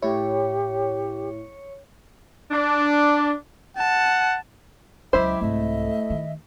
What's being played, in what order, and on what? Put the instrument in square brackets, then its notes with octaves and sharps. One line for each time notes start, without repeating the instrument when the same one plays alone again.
[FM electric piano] A2 E4 [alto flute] G4 [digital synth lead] C#5
[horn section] D4
[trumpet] F#5 [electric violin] A5
[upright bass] C#2 F#3 [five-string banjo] E4 C5 [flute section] D#5 E5 D6 [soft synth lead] G5
[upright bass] C2 G#2 [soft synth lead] A3 [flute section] D#5 E5
[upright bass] D#3